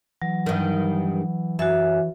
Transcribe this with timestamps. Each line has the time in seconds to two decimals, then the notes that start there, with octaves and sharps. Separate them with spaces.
0.22 E3 F#3
0.46 G2 D#3
1.59 F#2 F#4 E5